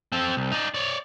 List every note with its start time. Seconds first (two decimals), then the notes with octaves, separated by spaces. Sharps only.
0.12 C4 A4
0.37 C2
0.52 D#4 D5
0.74 C#5 D5